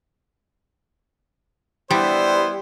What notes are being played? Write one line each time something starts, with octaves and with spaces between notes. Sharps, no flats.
G3 B3 E4 C5